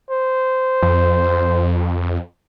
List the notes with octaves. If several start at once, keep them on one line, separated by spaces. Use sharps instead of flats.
C5
F2